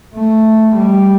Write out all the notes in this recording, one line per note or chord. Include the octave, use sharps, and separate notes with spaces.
A3
G3